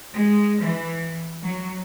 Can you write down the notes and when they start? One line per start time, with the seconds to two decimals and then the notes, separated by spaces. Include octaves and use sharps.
0.14 G#3
0.61 E3
1.43 F#3